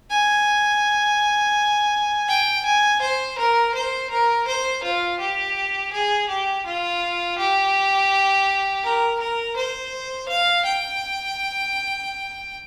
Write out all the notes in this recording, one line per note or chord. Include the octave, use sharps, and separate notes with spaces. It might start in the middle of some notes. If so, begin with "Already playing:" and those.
G#5
G5
G#5
C5
A#4
C5
A#4
C5
F4
G4
G#4
G4
F4
G4
A#4
A#4
C5
F5
G5